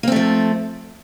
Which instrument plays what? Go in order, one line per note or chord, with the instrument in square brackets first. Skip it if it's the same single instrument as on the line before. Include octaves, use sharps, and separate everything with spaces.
[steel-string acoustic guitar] A#3
C4
A3
F3